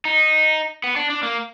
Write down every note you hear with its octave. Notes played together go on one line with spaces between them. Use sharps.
D#4
B3
D4
D4
A#3